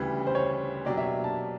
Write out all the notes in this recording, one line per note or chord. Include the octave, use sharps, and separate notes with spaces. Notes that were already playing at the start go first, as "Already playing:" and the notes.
Already playing: D2 C#3 E3 G3
C5
C#5
B2 F#3 A#3 D4 G4 D5
E5
A5